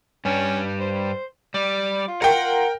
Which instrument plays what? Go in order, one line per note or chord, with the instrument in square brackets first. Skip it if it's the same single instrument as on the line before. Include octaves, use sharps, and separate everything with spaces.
[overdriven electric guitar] G2 G3 [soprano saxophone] C#4
[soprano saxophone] C5
[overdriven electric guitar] G3 [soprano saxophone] D5
[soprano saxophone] F4
[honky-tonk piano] A#4 G5 [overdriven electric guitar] F#5